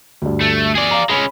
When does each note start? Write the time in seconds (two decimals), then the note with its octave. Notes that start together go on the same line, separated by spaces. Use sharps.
0.22 D2 G2
0.41 A3
0.75 G#4 D5
0.91 F5 A#5
1.10 G#3 C#4 B5